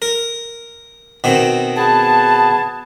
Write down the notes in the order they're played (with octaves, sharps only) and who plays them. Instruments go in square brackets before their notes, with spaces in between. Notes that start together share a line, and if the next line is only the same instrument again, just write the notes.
[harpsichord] A#4
B2 D#3 C4
[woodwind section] B3 G#4 A5